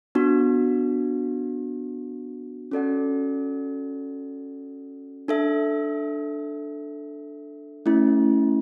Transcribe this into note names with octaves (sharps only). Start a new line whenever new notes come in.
B3 D4 F#4
C#4 F#4 A4 D5 F#5
D4 A4 E5
A3 C#4 E4